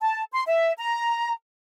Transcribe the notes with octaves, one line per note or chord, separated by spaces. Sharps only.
A5
C6
E5
A#5